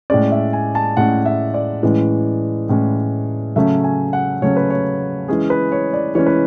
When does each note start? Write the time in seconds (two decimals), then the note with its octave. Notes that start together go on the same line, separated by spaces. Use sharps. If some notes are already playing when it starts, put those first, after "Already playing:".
0.10 A2 G#3 C#4 D5
0.32 E5
0.53 G#5
0.75 A5
0.97 A2 G#3 C#4 F#5
1.25 E5
1.54 D5
1.83 A2 E3 G#3 C#4
2.69 A2 E3 G#3 C#4
3.56 C#3 F#3 A3 C#4 E5
3.84 G#5
4.13 F#5
4.42 C#3 F#3 A3 C#4 C#5
4.57 B4
4.70 C#5
5.28 E3 G#3 C#4 G#4
5.50 B4
5.72 C#5
5.93 D5
6.15 E3 G#3 C#4 C#5
6.26 B4